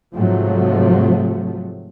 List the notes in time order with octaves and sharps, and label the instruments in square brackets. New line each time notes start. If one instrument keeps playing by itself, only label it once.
[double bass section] G#2 C3 F3 F#3 A3